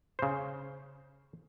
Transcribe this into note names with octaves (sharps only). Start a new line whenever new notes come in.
C#3 C5